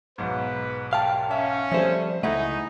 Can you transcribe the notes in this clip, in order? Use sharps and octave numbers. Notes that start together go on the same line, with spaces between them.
B1 G#2 B4
G4 A#4 D5 F5 A5
C#4 E5
F3 G3 A3 C4 G#4 C5 E5
C#2 A3 D#4 E4 A4 E5 F#5 G#5